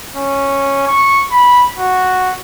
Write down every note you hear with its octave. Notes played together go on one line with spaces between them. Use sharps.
C#4
C#6
B5
F#4